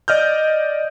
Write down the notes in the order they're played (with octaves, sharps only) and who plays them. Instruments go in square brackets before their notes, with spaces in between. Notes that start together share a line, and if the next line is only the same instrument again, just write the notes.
[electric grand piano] D5 D#5 F6 G6